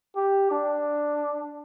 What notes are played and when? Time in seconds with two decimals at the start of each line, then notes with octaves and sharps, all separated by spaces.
0.16 G4
0.51 D4